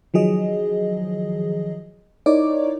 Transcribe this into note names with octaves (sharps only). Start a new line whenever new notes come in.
D#3 F3 F#3 G#4 D#5
D#4 E4 A#4 C#5 D5 D6